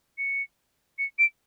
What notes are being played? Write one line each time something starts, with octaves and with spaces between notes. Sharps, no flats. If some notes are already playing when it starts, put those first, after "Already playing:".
C#7
C#7
D7